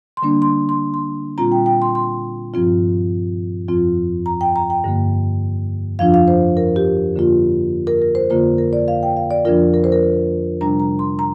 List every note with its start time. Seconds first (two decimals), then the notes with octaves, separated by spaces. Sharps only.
0.17 C6
0.22 D3 G3 A#3 D4
0.42 C6
0.69 C6
0.94 C6
1.38 A#2 G3 C4 F4 A#5
1.52 G5
1.66 G5
1.82 C6
1.95 C6
2.54 G2 F3 C4 F4
3.68 F2 F3 C4 F4
4.26 A#5
4.41 G5
4.56 A#5
4.70 G5
4.84 G2 D3 A#3
5.99 F2 F3 D4 F4 F5
6.14 F5
6.28 C5
6.57 A#4
6.76 G4
7.14 F2 D3 A#3 F4
7.87 A#4
8.02 A#4
8.15 C5
8.30 F2 D3 A#3 F4 C5
8.58 A#4
8.73 D5
8.88 F5
9.03 G5
9.17 F5
9.31 D5
9.45 F2 F3 D4 F4 A#4
9.74 A#4
9.84 C5
9.92 A#4
10.61 C3 G3 D4 A#5
10.80 A#5
10.99 C6
11.19 A#5